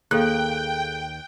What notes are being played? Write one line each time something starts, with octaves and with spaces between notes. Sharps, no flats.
D#2 G#4 A4 F5 G5 F#6